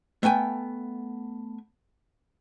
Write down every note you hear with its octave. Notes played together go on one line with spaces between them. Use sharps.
A3 B3 G5 G#5